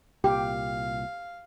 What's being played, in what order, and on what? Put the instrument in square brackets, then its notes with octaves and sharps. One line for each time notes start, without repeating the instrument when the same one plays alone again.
[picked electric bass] C2 A#2 [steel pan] G4 [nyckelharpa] F5 [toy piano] G5